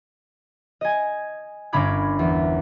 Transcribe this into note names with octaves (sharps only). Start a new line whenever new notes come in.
D#5 G#5
G1 C#4 A#4 B5 D6 G#6
E2